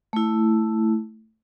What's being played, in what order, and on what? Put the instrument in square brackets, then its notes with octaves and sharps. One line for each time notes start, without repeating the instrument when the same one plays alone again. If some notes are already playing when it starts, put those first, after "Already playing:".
[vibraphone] A3 E4